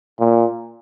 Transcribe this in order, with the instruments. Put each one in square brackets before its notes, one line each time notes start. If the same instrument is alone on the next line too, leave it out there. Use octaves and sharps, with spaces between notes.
[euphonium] A#2